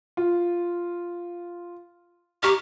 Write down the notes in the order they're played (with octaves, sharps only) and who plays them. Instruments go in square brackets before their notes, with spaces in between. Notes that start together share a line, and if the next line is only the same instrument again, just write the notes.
[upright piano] F4
[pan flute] G4 [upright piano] A#5 C#6 F6